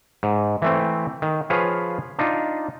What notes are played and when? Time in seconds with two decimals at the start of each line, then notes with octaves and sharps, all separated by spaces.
0.23 G#2
0.62 E3 A3 C4
1.22 D#3
1.50 F3 G#4 B4 C#5 F5
2.19 D4 D#4 F4